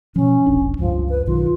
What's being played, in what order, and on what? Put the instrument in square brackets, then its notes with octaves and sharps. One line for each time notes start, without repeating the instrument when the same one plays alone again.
[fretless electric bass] B2 F3 [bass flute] C#4
[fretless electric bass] E1 A#1 D4
[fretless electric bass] C#2 G2 [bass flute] F3
[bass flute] B4
[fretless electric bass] B1 D#3 F#3 [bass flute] F4